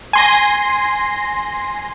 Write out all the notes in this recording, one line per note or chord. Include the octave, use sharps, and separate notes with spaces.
G#5 C6 A#6